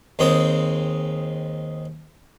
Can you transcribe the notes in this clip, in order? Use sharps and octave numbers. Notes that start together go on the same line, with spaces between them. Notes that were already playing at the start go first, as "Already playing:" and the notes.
D#2 G#3 C4 D#6